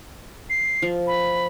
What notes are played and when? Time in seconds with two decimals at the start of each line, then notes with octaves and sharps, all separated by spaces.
0.50 C7
0.82 F3
1.07 B5